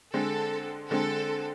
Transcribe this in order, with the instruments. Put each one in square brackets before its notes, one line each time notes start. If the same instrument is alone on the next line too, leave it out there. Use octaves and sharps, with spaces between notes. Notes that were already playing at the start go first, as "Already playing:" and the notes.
[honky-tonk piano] D3 G#3 C4 [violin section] A4
[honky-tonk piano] D3 G#3 C4 [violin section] A4